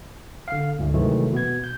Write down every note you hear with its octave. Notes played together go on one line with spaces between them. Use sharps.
D3 F5
D2 G#2 A3
C3 D#3 E3 F#3 G#3 A3
B2 B3 G#6
G6